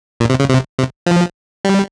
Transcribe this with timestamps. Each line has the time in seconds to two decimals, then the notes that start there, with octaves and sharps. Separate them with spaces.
0.20 A#2
0.30 C3
0.40 C#3
0.50 C3
0.79 C3
1.06 F3
1.65 G3